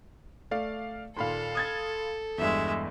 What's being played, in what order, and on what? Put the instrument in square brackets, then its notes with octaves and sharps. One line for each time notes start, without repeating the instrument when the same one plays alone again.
[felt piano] A3 [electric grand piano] D5 F5
[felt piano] D#2 A#2 [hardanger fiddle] A4 [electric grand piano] F5 B5 C6
[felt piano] D#6 G#6 A6
[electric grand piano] E2 G2 [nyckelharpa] G#3 E5